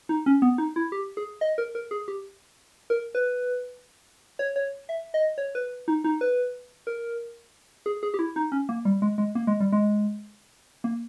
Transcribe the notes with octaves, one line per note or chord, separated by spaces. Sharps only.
D#4
C#4
B3
D#4
E4
G4
G#4
D#5
A#4
A#4
G#4
G4
A#4
B4
C#5
C#5
E5
D#5
C#5
B4
D#4
D#4
B4
A#4
G#4
G#4
G4
E4
D#4
C#4
A#3
G3
G#3
G#3
A#3
G#3
G3
G#3
A#3